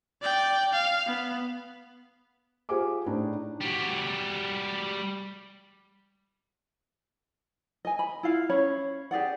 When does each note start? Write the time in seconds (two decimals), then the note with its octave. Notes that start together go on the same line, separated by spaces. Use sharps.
0.22 D5 G5
0.73 F5
1.07 B3
2.69 F4 G4 G#4 C5 G#5 D6
3.06 A2 D4 D#4
3.61 G3 F#4
7.85 D#5 G#5
7.99 B5
8.23 E4 F4 F5
8.50 C#4 C#5 B5
9.11 G4 G#4 D5 F#5